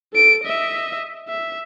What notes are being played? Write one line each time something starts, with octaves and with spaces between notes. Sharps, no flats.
A4 D7
D#5 E5
E5